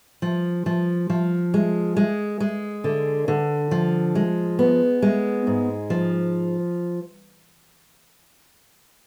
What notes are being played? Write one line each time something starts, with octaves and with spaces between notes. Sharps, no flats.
F3
F3
F3
G#3
G#3
G#3
D3
D3
F3
G#3
B3
G#3
G#2
F3